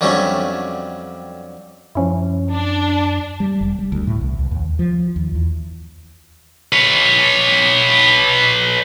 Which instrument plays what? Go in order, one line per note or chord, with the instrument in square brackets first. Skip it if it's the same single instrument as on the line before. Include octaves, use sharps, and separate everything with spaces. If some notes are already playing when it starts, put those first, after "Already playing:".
[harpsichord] F2 D3 F#3 G3 A3 C#4
[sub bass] F#2 [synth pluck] F3 C#4 E4
[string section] D4
[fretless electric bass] G3
F1
G3
D2
A2
C2
C#2
D#2
F3
D#2
E2
[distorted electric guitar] B4 C#5